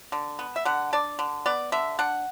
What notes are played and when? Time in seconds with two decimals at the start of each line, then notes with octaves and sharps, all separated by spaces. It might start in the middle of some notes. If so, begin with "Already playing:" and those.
0.12 D3
0.39 B3
0.56 E5
0.65 D3 F#5
0.93 D4 D5
1.19 D3
1.46 B3 D5
1.72 D3 E5
1.99 D4 F#5